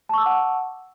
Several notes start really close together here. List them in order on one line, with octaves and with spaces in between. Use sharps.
A5 C#6 E6 D6 F#5